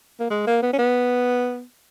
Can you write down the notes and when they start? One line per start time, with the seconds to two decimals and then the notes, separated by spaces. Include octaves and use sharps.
0.20 A#3
0.31 G#3
0.47 A#3
0.62 B3
0.73 C#4
0.79 B3